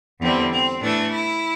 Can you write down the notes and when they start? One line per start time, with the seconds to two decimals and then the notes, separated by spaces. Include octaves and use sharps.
0.20 E2 D3 G3 C4
0.50 C4
0.81 A2 E3 A3 D4
1.11 E4